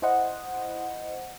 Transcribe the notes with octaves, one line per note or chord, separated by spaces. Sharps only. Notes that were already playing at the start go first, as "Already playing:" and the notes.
E4 C5 D#5 F#5